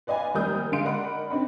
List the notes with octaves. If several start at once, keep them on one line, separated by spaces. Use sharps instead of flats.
B4 D5 D#5 F5 G#5 B5
F1 D#2 G3 A#4 D#6 G6
D3 G#3 F5 C6 D7
A#4 D5 D#5 F#5 B5
C4 D4 D#4 D#5 B5